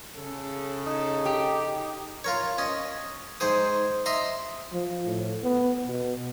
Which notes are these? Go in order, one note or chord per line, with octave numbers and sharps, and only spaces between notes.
C#3 A4
D#4
G4
F4 A#4 C#5
C#4 D#5
G#2 G#4 C5 D#6
D#5 E5 A#5 C6
F3
A2
B3
B2